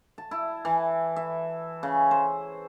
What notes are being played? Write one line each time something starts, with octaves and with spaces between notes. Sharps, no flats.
A5
E4
E3
E5
C#3
C5